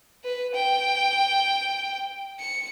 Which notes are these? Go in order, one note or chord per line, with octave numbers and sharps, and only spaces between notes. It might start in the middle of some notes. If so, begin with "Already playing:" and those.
B4
G5
C#7